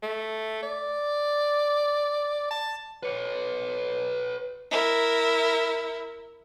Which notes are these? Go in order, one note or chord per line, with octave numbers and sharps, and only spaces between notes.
A3
D5
A5
B4 C#5
E4 A#4